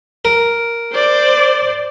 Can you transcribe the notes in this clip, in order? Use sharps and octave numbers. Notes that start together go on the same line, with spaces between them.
A#4
C5 D5